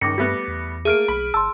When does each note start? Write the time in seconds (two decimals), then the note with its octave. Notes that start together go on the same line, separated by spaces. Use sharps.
0.01 C#2 G2 D#3 D6 A#6 C#7
0.18 G3 A3 B3
0.48 E2
0.85 A3 A#3 G#4 F6 D7
1.08 B1 B5
1.34 G1 A5 C6 E6